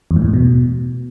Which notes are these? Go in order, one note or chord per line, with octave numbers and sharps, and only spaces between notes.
E2
G#2
A2
E2
B2